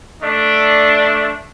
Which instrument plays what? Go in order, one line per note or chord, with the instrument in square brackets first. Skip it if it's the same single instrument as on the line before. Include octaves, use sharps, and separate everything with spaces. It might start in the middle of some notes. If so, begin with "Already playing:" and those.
[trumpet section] A3 D4